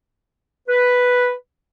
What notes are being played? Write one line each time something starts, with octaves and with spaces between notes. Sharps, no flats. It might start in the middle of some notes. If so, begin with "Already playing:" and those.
B4